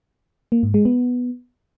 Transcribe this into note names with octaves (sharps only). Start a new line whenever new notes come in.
A#3
G#2
G#3
B3